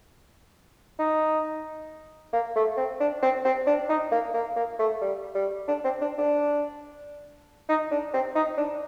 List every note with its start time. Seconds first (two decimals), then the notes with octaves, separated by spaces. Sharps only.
0.99 D#4
2.33 A#3
2.56 A3
2.77 C4
3.00 D4
3.22 C4
3.45 C4
3.67 D4
3.89 D#4
4.12 A#3
4.34 A#3
4.56 A#3
4.79 A3
5.01 G3
5.35 G3
5.68 D4
5.84 C4
6.01 D4
6.18 D4
7.69 D#4
7.91 D4
8.14 C4
8.35 D#4
8.57 D4